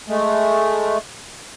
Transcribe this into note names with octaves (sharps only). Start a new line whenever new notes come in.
G#3 A3